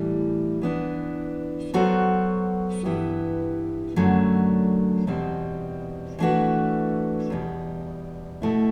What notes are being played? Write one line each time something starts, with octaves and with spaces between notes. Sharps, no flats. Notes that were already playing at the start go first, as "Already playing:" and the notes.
Already playing: A2 E3 G3
E3 B3 D4
F#3 B3 F#4 A4 C5
G2 E3 B3 E4 G4
F#2 D3 F#3 A3 D4
E2 B2 G3 C4
E3 A3 D4 F#4 B4
E2 B2 G3
B2 A3 E4